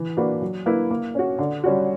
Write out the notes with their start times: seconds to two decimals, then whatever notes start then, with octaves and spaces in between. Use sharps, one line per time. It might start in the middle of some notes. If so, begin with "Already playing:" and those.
Already playing: E3
0.17 A#3 D4 F#4 B4
0.42 F#3
0.66 A#3 E4 B4
0.90 A#3
1.15 C#4 F#4
1.38 D3
1.64 G3 C#4 F#4